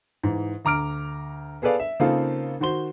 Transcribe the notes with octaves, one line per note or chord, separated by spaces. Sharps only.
G#2 E3
D2 A#5 D6 F6 D7
B3 G#4 A4 B4 D5 F5
E5
C#3 A#3 C4 D#4 F4 A4
D#3 F#4 C5 C6 G7